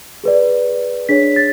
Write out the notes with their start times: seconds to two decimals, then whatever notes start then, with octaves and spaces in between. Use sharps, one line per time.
0.24 G#4 B4 D5
1.09 D4 G#4 C#5 B6
1.36 A6